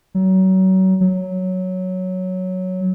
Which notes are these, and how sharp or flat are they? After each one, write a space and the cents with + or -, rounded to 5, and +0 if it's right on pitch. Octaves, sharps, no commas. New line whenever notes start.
F#3 +30
F#3 +0